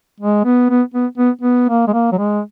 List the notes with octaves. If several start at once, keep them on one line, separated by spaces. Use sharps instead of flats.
G#3
B3
B3
B3
B3
B3
A#3
G#3
A#3
F#3
G#3